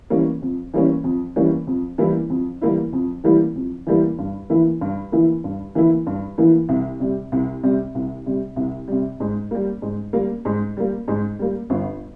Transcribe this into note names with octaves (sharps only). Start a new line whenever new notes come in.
E3 G3 A#3 C#4
F2
E3 G3 A#3 C#4
F2
E3 G3 A#3 C#4
F2
E3 G3 A#3 E4
F2
E3 G3 A#3 E4
F2
E3 G3 A#3 E4
F2
E3 G3 A#3 E4
G2
E3 A#3 E4
G2
E3 A#3 E4
G2
E3 A#3 E4
G2
E3 A#3 E4
C2
C3 G3
C2
C3 G3
C2
C3 G3
C2
C3 G3
G#2
G3 A#3
G#2
G3 A#3
G#2
G3 A#3
G#2
G3 A#3
G1